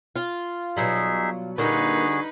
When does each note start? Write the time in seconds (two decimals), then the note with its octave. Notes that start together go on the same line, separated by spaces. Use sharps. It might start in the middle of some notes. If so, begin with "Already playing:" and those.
0.16 F4
0.76 B2 F#3 G3 D#4 G#4 E5
1.58 A#2 D3 G3 D4 D#4 F#4 G#4 B4